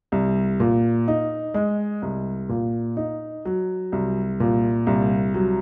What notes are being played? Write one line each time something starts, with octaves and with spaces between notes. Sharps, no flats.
C2
A#2
D#4
G#3
C2
A#2
D#4
F#3
C2
A#2
C2
F#3